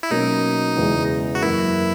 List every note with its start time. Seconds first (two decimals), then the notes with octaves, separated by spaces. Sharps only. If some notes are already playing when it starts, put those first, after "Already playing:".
0.03 E4
0.10 B2 F#3 A#3 C#4 D#4
0.77 E2 C#3 E3 G#3
1.35 F#4
1.42 F#2 E3 A#3 E4